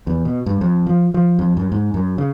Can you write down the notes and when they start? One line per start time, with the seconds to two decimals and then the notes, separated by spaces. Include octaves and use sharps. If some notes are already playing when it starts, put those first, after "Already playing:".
0.07 E2
0.25 B2
0.46 G2
0.61 F2
0.86 F3
1.14 F3
1.39 F2
1.57 F#2
1.72 G#2
1.94 F#2
2.18 C#3